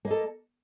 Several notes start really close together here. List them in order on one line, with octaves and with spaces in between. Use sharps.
A#3 D#5 A4